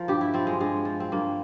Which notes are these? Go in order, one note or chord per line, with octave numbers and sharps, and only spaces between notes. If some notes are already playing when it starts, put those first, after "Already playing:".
Already playing: F3 A#4
G2 G4
E4
F3 C4
G#3
G2 G#3
F3
C4
G2 A#3